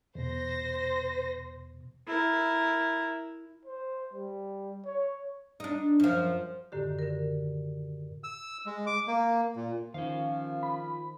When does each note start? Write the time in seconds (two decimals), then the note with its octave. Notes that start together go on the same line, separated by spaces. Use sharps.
0.15 E2 B2 C5 A#6
2.07 E4 A#4
3.65 C5
4.13 G3
4.85 C#5
5.60 D4 D#4
6.00 F#2 F3
6.72 F#2 A2 D3 D#3 G4
6.99 D3 A#4
8.24 E6
8.66 G#3
8.87 D6
9.08 A#3
9.56 A#2
9.94 D#3 F3 C#4 F5
10.63 B5